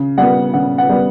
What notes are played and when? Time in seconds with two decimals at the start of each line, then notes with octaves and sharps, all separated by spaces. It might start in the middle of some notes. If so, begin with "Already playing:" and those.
Already playing: C#3
0.18 G3 B3 F#5
0.54 C#3 F#5
0.78 F#5
0.89 G3 B3